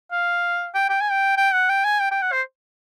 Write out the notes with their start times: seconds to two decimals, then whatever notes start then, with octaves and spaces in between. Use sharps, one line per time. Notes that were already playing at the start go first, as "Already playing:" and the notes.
0.12 F5
0.75 G5
0.89 G5
1.01 G#5
1.11 G5
1.37 G5
1.53 F#5
1.69 G5
1.85 G#5
2.00 G5
2.11 G5
2.22 F#5
2.32 C5